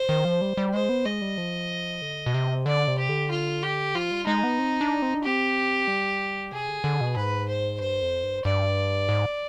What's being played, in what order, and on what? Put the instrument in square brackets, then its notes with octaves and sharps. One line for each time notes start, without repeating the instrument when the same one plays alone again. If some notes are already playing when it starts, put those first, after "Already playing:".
Already playing: [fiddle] C5
[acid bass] D#3
F3
G3
G3
[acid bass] G#3 [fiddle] C5
[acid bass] B3
[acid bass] G#3 [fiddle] D#5
[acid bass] G3
F3
D3
B2
C3
[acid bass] D3 [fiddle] D5
[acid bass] C3
[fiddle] G4
[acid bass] D3
[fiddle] F4
G4
[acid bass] F3 [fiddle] F4
[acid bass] G3
[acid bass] G#3 [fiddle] D#4
[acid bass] B3
C4
D4
C4
D4
[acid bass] C4 [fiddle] G4
[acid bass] G3
[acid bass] C3 [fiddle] G#4
[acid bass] D3
D3
B2
[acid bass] G#2 [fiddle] B4
[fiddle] C5
[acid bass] G2 [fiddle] C5
[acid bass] F2
G2
[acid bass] G2 [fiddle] D5
[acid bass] G#2